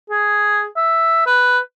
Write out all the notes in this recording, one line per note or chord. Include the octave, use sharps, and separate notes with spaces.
G#4
E5
B4